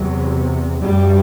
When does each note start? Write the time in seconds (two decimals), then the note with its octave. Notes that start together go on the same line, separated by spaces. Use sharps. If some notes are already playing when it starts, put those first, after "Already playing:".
Already playing: E2 C3 F#3
0.82 F#2 C#3 G3